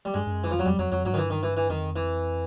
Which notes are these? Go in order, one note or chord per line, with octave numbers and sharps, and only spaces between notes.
G3
G2 G#3
G2
F#2
E3
F2 F3
F#3
F2 G3
F2 F#3
F2 F#3
G2 F#3
G#2 D#3
G2 E3
D#3
E3
E3
F2 D#3
E3